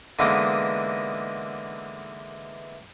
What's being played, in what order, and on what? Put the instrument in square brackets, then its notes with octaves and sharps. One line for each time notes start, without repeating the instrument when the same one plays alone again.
[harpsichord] D3 E3 G#3 A#3 B3 D#4